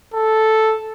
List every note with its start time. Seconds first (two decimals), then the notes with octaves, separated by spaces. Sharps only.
0.14 A4